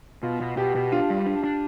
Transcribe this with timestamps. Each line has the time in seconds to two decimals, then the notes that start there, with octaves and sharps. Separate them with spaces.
0.23 B2 F4
0.40 B2
0.57 B2 G4
0.75 B2
0.92 D4 F4
1.10 G3
1.27 D4
1.44 D4